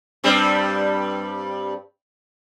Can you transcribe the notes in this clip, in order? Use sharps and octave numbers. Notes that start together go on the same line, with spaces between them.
G2 G3 C4